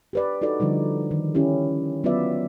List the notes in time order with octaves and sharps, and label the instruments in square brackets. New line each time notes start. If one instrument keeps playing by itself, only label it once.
[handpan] G4 B4 D5
D#4 F#4 A4 D5
D3 F3 G3 D#4
D#3
C#4 E4 G4
F#3 B3 F4 B4 D5 E5